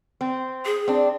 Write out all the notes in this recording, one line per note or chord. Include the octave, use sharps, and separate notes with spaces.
C4
G#4
C4 D4